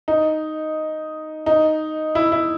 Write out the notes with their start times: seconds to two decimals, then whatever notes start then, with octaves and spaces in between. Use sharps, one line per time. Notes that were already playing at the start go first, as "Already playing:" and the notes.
0.08 D#4
1.46 D#4
2.15 E4
2.32 E4